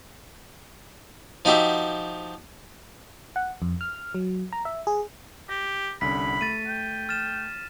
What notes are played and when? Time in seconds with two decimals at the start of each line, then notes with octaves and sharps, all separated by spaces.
1.45 F3 D#4 F#4 G4 E5
3.36 F#5
3.62 F2
3.81 F6
4.15 F#3
4.53 A#5
4.65 E5
4.87 G#4
5.49 G4 A#6
6.01 C2 D3 C#4 B5 B6
6.41 A3 A6 D#7
6.67 G5
7.09 F6 A6 E7